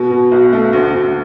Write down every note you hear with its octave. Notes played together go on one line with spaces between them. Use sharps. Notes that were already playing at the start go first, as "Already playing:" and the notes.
Already playing: B2
B2
B1
A3
D2
D2